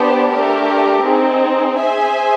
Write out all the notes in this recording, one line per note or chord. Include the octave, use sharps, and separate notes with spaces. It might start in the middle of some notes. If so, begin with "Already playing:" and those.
Already playing: B3 D4 G4 C5
A3 D4 G4 A#4
C4 D#4 G#4
G#4 C5 E5 G#5